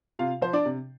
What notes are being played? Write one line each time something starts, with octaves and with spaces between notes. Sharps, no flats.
C3 F4 F5
F3 C5
D4 D5
C3